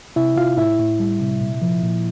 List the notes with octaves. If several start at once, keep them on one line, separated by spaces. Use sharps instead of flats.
C3 E4 E5
C3 F4 F5
A2 E4 E5
A2
G3
C3
A#2
F3
A#2